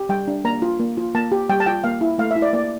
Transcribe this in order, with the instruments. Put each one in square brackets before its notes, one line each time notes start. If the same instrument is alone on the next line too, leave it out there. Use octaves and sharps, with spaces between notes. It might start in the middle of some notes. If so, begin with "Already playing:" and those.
Already playing: [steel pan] G4
G3 G5
D4
A#3 A#5
F4
A#3
F4
A#3 A5
G4
G3 G5
A5
F4 G5
A#3 F5
E4
A3 F5
E5
E4
D5
A#3 D5